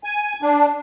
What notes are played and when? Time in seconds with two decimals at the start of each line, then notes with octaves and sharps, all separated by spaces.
0.04 G#5
0.42 D4